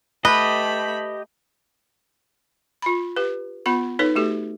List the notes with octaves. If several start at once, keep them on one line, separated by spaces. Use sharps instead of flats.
A3 G4 B4 D#5 B5
F4 B5
G4 B4
B3 F4 B5
D#4 A4 B4 C#5
A3 F#4 G4 A4